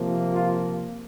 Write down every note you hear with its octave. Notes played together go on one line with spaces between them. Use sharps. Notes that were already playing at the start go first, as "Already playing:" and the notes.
Already playing: C3 F3 A#3
F4